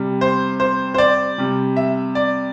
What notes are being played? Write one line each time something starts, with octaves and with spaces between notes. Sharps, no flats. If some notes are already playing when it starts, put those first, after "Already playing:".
Already playing: C3 G3
C5
C5
C5
D5
C3 G3
E5
D5